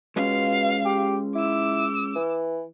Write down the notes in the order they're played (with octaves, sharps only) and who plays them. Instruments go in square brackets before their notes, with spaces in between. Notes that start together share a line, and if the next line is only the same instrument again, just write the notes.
[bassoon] B2 [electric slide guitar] G#3 C#4 F4 [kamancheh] F5
[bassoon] G4
[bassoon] E4 [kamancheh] D6 E6
[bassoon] E3